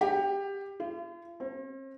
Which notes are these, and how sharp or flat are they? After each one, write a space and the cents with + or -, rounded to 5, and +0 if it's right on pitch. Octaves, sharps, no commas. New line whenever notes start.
G4 +15
F4 -45
C4 +45